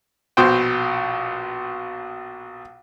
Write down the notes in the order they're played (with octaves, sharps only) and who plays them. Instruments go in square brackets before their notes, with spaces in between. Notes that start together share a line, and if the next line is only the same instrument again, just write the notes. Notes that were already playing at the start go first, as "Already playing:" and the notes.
[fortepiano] A#1 B2 C5 G5